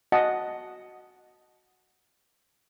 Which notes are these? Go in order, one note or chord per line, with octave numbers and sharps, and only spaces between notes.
F#4 D#5 F#5 A5